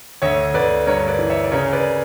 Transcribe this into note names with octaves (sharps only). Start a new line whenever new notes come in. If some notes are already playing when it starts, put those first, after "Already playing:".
D2 C#5 E5
D2 B4 D5
G2 A#4 C#5
B4 D5
E3
C#5 E5
D5
C#3 A#4 C#5
B4 D5